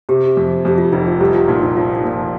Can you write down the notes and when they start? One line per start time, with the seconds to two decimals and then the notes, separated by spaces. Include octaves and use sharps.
0.09 C3 G4
0.37 F2
0.65 F2 G4
0.78 F4
0.92 F1 D#4
1.07 F4
1.20 C2 G4
1.34 F4
1.48 A#2 D#4
1.63 D#4
1.76 F3 F4
1.95 D#4
2.04 A#2